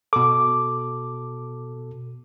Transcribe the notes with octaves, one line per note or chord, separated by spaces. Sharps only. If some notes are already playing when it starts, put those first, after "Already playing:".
B2 A4 D6